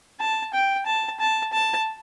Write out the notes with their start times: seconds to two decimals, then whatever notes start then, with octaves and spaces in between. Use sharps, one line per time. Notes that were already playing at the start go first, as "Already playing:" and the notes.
0.20 A5
0.54 G5
0.86 A5
1.20 A5
1.53 A5